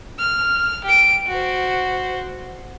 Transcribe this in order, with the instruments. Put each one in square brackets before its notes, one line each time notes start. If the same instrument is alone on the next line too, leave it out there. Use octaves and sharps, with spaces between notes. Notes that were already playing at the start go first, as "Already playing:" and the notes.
[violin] F6
G4 D7
F#4 C5